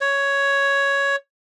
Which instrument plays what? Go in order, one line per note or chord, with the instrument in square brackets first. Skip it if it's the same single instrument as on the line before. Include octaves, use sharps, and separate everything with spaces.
[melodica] C#5